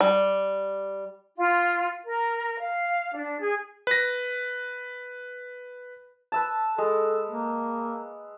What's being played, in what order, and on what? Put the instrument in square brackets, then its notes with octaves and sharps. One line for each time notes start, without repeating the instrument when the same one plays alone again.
[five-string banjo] G3
[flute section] F4
A#4
F5
D4
G#4
[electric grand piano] B4 A#6
[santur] B4 E5 A5
[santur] G#3 [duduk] A4
[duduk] A#3